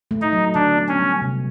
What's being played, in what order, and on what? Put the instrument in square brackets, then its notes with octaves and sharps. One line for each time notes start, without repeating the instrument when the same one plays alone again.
[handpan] A3
[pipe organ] D#4
[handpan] F#3
[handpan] D3 [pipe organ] D4
[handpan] B3
[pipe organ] C#4
[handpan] G3
C3